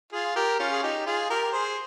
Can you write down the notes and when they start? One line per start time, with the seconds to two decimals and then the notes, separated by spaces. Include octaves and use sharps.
0.12 F4 G#4
0.36 G4 A#4
0.59 C#4 F4
0.72 G#4
0.83 D#4 G4
1.06 F4 G#4
1.30 G4 A#4
1.52 G#4 C5